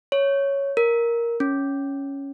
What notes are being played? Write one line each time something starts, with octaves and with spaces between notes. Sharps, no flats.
C#5
A#4
C#4